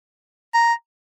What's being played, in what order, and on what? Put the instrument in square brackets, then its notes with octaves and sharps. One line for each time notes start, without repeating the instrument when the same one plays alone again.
[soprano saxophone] A#5